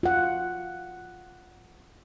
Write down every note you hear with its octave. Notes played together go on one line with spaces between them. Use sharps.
F4 F#5